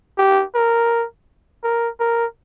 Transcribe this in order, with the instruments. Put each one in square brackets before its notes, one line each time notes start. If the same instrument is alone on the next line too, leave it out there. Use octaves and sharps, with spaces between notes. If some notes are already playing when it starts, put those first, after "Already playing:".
[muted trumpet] G4
A#4
A#4
A#4